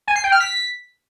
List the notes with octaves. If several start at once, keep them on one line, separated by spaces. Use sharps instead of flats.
G#5
C7
G5
F6
B6